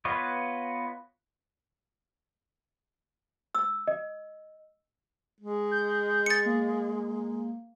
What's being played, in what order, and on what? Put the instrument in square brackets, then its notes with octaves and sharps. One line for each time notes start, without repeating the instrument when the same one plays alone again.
[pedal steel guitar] B3 F4 B4 C#5 D#5
[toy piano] E6
[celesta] D#5
[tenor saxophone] G#3
[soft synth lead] G6
[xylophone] A6 C#7
[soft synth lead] A#3